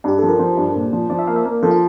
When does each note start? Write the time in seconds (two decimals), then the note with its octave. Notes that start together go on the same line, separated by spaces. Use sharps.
0.04 G2 G4
0.18 F3 A4
0.29 A#4
0.39 F3 C5
0.57 G2
0.75 A#2
0.92 F3
1.10 F3 D5
1.19 E5
1.27 A#3 F5
1.36 E5
1.45 A#3
1.62 F3 A4
1.71 F4